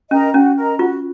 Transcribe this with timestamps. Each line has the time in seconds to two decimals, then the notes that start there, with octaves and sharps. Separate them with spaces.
0.11 C#4 A#4 D#5 A#5
0.34 C#4 F#4
0.56 A#4 D#5 A#5
0.79 F4 F#4